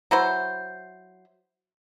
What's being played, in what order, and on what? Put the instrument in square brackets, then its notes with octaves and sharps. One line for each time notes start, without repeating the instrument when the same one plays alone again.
[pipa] F#3 E4 C5